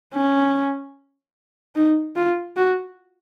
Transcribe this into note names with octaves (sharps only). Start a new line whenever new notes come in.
C#4
D#4
F4
F#4